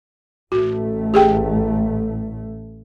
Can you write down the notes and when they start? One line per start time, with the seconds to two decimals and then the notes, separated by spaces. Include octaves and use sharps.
0.52 A1 A3 F#4
1.14 G4 G#4 G5